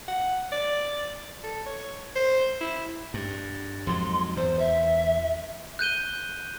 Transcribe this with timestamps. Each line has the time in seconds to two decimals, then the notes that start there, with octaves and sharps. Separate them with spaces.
0.08 F#5
0.52 D5
1.43 A4
1.66 C#5
2.16 C5
2.61 E4
3.14 G2
3.87 F2 G#2 F#3 C6
4.37 E2 C5
4.59 E5
5.79 F#6 G6 D#7 G7